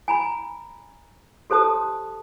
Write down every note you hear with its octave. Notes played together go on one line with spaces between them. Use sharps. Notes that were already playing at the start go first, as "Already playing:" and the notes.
G#5 A#5 B5
G4 A4 C5 A5 D#6